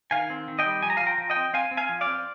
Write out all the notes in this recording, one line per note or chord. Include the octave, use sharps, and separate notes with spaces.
D#3 F5 G#5
C4
D#3
D#5 G5
G3
F3 G#5
A#5
F5 G#5
F3
G5 A#5
F3
D#5 G5
C4
C4 F5 G#5
C4
F5 G#5
F3
D5 F5
C4